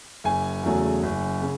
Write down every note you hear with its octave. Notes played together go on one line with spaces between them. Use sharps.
F#1 G#5
E2 C#3 F#3 A3
F#1
C#3